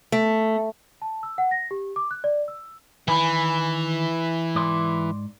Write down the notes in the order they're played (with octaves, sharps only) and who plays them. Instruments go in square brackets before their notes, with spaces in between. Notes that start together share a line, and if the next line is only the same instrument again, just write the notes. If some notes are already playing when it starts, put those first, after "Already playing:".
[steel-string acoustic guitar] A3
[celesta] A5
E6
F#5
A#6
G4
D6
F#6
D5
E6
[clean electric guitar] D#3 G#5 B5 [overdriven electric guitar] E3
[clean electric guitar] G#2 D5 C6